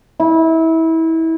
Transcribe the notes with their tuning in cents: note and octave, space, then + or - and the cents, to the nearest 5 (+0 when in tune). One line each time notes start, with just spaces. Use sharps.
E4 -25